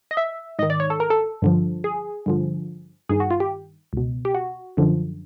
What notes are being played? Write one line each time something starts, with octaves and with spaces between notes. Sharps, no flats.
D#5
E5
G#2 D#3 D#5
D5
C#5
A4
A#4
A4
G2 D3 F3
G#4
G2 D3 F3
G2 D#3 G#4
F#4
F4
G4
C#2 B2
G4
F#4
F#2 D3 F3